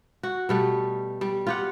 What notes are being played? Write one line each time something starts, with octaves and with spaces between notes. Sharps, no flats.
F#4
B2 G3 A3
G3
F4 G4 F#5